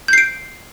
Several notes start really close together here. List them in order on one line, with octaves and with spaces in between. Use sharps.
G6 C7 D7